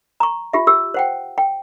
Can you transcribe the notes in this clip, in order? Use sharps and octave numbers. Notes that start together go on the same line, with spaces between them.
A#5 C#6
F4 G4 E5
G4 E6
C5 F#5 G5
G5